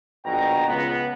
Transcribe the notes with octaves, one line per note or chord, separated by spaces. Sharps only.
A#1 B2 G5 A#5
C#2 B3